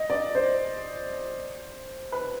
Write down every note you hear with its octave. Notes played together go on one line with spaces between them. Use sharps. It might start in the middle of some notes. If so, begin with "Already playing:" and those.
Already playing: D#5
D5
C5
B4